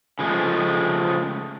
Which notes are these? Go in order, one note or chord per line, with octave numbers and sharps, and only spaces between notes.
C#3 F3 G#3 A3